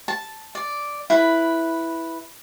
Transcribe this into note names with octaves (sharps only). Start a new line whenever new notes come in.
A5
D5
E4 B4